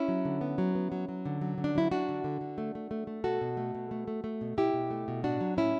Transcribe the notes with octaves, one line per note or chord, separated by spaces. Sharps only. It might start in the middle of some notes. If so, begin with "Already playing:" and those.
Already playing: C#4 E4
F#3
D3
B3
F#3
B3
F#3
F#3
D3
F#3
D3
D4
F#3 E4
F#3 D4 F#4
D3
D3
D3
A3
A3
A3
A3
B2 F#4 A4
B2
A3
B2
A3
A3
A3
B2
B2 E4 G4
B2
A3
B2
A2 D4 F#4
F#3
A2 C#4 E4